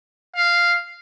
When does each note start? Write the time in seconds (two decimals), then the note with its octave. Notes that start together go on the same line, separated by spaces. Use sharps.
0.36 F5